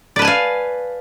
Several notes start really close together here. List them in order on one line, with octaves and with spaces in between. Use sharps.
D5 B4 A5 G#5 F5